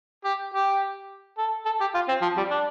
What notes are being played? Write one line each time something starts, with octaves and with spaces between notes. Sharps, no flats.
G4
G4
A4
A4
G4
F4
C4
F3
G3
D4